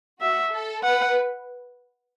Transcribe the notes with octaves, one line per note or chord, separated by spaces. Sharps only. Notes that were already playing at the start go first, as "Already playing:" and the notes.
F#4 E5
A4
B4 F#5